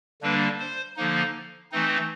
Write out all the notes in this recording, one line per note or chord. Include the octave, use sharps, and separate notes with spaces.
D3 G3 A#3 D4 B4
C5
D3 F3 A#3 D#4
E3 A3 C4 D#4